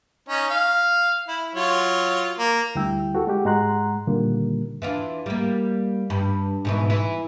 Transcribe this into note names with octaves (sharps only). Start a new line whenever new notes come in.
C#4 D#4
F5
E4
F#3 F4 C#5
A#3
D2 G3 E4 G5 E6
F#4 G4 A4
G#3 F#4 G4
G#2 G#3 F#5 A#5 C6 F#6
A#2 D3 D#3 G3 A#3
E3 D4 F4
G3 A#3
G2
G#2 B2 E3
E3